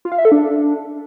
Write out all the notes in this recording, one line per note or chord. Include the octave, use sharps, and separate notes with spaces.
F4
F5
E5
A4
D4